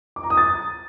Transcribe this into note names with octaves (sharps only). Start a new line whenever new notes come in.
D6
A#5
D#6
A6